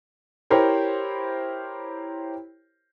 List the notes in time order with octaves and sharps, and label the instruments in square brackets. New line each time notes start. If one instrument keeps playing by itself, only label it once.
[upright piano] E4 G4 A#4 C5 C#5